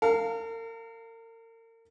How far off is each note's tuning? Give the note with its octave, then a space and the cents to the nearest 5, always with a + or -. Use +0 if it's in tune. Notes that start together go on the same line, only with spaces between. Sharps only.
A#4 -40 F5 +0